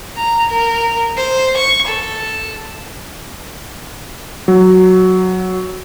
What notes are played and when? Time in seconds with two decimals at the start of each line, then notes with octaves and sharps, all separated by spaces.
0.16 A#5
0.49 A#4
1.17 C5
1.57 C#6
1.87 A4
4.48 F#3